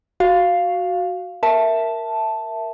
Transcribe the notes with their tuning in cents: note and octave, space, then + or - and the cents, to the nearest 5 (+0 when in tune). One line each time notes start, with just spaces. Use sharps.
F#4 +0 F5 +0
A#4 +0 E5 +0 A5 +0